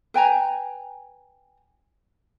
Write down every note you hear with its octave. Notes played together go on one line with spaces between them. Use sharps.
B4 G5 G#5 A#5